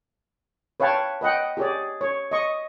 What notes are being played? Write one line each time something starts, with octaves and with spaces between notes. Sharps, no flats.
B4 C#5 F5 G5 A5
B4 D#5 F#5 G5
G4 G#4 C#5 D5
C#5
D#5 C#6